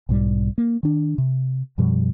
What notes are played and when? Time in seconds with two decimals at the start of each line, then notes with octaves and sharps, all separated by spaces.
0.09 B1 G#2 G3
0.58 A#3
0.83 D#3 D4
1.18 C3
1.78 F#2 B2 F3 G3